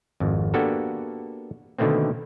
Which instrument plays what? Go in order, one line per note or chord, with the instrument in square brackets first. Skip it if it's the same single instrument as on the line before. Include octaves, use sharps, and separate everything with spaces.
[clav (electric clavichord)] G#1 F2
A#3 B3 D4 F#4 G4 A4
B2 D3 D#3 A3 A#3 C4